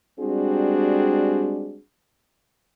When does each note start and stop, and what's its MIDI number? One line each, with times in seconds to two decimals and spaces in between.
0.19 1.79 55
0.19 1.79 56
0.19 1.79 60
0.19 1.79 62
0.19 1.79 66
0.19 1.79 68